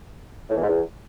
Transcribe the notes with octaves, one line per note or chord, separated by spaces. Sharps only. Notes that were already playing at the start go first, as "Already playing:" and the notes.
A2
E2
G#2
E2